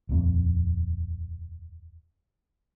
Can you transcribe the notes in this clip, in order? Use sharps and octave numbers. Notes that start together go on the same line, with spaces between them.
D#1 F2 C4